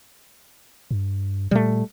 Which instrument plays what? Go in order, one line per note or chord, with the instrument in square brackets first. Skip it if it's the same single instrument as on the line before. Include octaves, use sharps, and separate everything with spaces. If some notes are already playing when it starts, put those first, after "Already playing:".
[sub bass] G2
[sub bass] A#2 [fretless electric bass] G3 A3